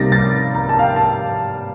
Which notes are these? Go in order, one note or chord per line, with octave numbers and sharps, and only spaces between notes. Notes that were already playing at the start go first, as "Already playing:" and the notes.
Already playing: C3 G3 A#3 D#4 A6 A#6
A6
A#5
A5
F5
G5
A5